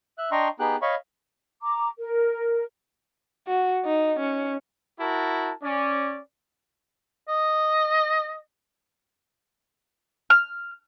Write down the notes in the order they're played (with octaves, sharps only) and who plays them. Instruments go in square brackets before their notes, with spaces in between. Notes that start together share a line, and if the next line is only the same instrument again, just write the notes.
[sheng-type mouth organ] E5 F#6
D4 D#5 G5 A#5 C6 C#6
B3 D#4 G4 G#4 G5 F#6
C#5 D#5 F5 B5 C#6
[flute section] A#5 D6
A#4
[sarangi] F#4
D#4
C#4
[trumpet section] E4 F#4 A#4 A5
C#4 D5
[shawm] D#5
[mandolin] F6